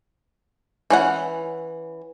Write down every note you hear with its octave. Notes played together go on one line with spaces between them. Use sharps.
E3 C#4 F#5